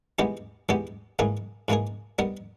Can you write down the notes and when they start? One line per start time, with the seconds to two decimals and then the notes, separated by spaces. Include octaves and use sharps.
0.19 E3 G#3 B3 D#4 G4
0.69 E3 G#3 B3 D#4 G4
1.19 G#2 E3 A#3 D#4 G#4
1.68 G#2 E3 A#3 D#4 G#4
2.19 G3 B3 D#4 A#4